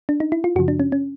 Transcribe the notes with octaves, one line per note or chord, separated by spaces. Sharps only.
D4
D#4
E4
F4
F#2 C#3 F3 F#4
D4
C#4
C#4